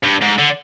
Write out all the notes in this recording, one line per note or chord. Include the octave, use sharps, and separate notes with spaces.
G2
G#2
D3